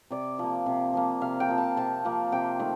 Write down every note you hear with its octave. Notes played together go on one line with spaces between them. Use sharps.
C3 D5
F3 A#3
C3
F3 A#3
C3 F5
G5
F3 A#3
A5
C3 A5
F3 A#3
C3 G5
D#3 A3 C4